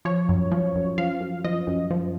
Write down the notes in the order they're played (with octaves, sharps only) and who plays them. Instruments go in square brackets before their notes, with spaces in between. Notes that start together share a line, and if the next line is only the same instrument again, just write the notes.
[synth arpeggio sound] F3 C#5
F#2
F3
F#2
F3 F5
F#2
F3 D#5
F#2
F3